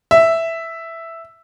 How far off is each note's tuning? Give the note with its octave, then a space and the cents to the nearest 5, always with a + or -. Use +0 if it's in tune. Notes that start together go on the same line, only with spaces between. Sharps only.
E5 +0